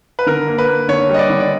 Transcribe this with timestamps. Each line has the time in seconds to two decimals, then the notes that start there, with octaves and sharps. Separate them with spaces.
0.19 B4
0.26 D3 A#4
0.47 A#3
0.58 B4
0.68 A#3
0.88 D3 C#5
1.09 G3 D#5
1.19 D5
1.30 D3
1.40 D5